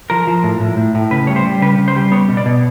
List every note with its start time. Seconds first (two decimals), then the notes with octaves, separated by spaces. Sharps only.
0.10 F3 A#4
0.27 F3
0.44 A2
0.60 A2
0.77 A2
0.95 A2
1.11 C#3 B4
1.27 G3 C#5
1.36 C5
1.45 G3
1.62 C#3 B4
1.79 C#3
1.88 C5
1.96 G3
2.12 B3 C#5
2.29 B2
2.37 D5
2.46 B2